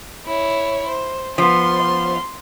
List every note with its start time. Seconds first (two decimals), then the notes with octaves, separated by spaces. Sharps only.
0.26 E4 C#5
0.88 C5
1.38 F3 B3 C6